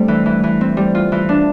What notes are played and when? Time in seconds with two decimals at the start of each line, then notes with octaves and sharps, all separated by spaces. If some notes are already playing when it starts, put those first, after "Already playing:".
Already playing: G3 A3 C4 D4
0.08 E3
0.26 E3
0.43 E3
0.61 C4
0.77 G3
0.95 F4
1.12 E3
1.29 D4